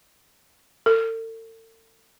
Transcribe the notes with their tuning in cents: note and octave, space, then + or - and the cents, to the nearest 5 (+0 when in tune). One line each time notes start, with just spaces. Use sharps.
A4 +40